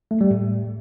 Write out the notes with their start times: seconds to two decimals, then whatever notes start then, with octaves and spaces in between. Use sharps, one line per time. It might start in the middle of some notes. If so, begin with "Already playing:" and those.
0.11 A3
0.21 G3
0.31 A2